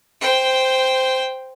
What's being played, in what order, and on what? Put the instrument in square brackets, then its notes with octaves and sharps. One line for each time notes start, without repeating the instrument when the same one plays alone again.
[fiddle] C5 G5